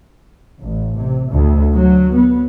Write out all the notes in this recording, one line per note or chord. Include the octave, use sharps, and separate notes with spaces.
A1
C3
D2
F#3
B3